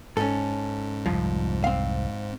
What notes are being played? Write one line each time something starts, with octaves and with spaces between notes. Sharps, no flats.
G#2 C#4 A4
C2 F2 F3
C4 F5